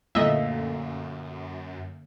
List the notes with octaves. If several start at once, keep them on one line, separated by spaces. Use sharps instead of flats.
F#2 A#2 D3 A3 A#3 D#5 E5